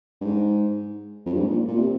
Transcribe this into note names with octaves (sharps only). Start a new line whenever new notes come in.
G2
G#2
F2
G2
G#2
A#2
A#2
C3